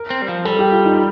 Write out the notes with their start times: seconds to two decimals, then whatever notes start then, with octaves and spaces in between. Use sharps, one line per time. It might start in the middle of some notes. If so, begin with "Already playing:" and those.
Already playing: A#4
0.10 C4
0.22 G3
0.28 F3
0.45 G3 A4
0.59 G4
0.72 F4
0.85 D#4